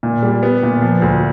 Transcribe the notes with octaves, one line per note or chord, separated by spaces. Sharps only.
A#2
G3
B3
A#2
F3
D2